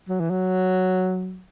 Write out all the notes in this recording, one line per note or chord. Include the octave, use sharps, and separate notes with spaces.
F#3
E3
F#3